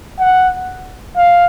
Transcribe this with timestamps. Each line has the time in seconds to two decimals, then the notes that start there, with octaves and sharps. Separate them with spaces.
0.19 F#5
1.17 F5